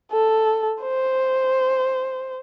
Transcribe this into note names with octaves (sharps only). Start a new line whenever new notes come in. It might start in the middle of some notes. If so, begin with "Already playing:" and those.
A4
C5